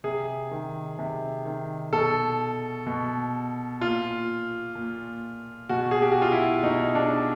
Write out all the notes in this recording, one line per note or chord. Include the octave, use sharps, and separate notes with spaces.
C3 G#4
D#3
C3
D#3
B2 A4
B2
A#2 F4
A#2
B2 F#4
G#4
G4
F#4
F4
E4
B2 D#4
D4